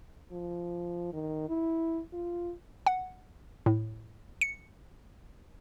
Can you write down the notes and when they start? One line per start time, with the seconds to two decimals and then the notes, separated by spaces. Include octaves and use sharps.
0.32 F3
1.13 D#3
1.49 E4
2.13 F4
2.86 F#5
3.66 A2
4.41 C#7